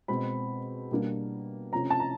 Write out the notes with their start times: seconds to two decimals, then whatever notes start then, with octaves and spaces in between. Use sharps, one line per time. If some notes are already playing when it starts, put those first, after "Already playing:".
0.08 B2 G#3 C4 B5
0.91 B2 G3 A#3 D4
1.72 C3 F3 A3 C#4 A#5
1.90 A5
2.00 A#5